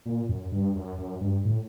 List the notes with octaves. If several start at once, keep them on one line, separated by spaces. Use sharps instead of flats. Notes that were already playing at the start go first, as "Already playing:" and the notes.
A#2
F#2
G2
F#2
F#2
G2
A2